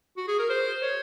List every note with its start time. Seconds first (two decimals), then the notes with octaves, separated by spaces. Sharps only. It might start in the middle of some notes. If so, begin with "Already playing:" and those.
0.18 F#4
0.28 G#4
0.39 A#4
0.50 C5
0.82 C#5